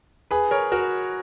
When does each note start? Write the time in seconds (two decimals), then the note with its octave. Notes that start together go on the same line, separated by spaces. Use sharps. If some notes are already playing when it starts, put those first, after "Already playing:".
0.31 G#4 B4
0.51 A#4 C#5
0.72 F#4 A#4